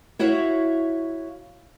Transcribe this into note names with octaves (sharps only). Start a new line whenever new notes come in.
E4 F#4 C#5 E5 F5